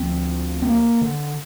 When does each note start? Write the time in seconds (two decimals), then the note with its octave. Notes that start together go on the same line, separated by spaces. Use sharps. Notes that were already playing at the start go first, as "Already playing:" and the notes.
Already playing: D2 F3 C4
0.62 C4
0.67 A#3
1.01 D3